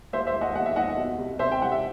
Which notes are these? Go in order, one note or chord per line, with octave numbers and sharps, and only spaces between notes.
D#2 C5 E5
C5 E5
D#2
D#5 F#5
D#2 F#5
E5
D#2 D#5 F#5
B2
C2
C2 C5 E5
G5
G3 F#5
E5